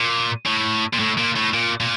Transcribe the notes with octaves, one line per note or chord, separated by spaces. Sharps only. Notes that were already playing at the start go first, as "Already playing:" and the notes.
Already playing: A#2
A2
A#2
A2
A#2
A2
A#2
A#2